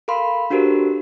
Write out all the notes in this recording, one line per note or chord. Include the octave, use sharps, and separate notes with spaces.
A4 A#4 F5 B5 C6
D4 F#4 G4 A4 A#4 C5